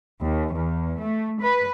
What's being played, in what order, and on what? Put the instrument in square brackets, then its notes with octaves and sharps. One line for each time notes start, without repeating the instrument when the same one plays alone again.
[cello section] D#2
E2
A3
B4